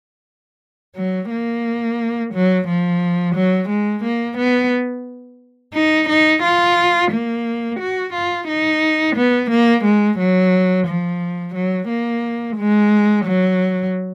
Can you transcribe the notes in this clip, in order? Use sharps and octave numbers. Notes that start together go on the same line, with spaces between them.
F#3
A#3
F#3
F3
F#3
G#3
A#3
B3
D#4
D#4
F4
A#3
F#4
F4
D#4
B3
A#3
G#3
F#3
F3
F#3
A#3
G#3
F#3